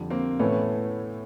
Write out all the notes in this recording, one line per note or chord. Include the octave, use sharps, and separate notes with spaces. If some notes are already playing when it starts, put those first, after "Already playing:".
Already playing: F2 D3 G3
A#3 C4
A2 E3 A3 B3 C#4